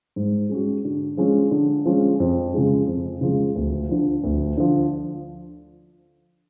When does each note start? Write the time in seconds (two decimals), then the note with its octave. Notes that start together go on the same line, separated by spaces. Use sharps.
0.16 G#2
0.49 G#3 C#4 F#4
0.84 D3
1.17 F3 G#3 C#4
1.51 D3
1.85 F3 G#3 C#4
2.20 F2
2.54 C#3 F3 G#3
2.87 F2
3.21 C#3 F3 G#3
3.56 D2
3.89 D3 F3
4.24 D2
4.57 D3 F3